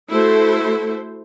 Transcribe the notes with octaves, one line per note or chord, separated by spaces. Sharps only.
A3 E4 F#4 A4 C5